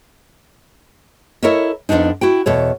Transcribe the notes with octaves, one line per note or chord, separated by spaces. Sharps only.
E4 A4 A#4 C#5 D#5 E5
F2 B2 B3 D4 D#4
E4 F#4 G5
E2 B2 A4 C#5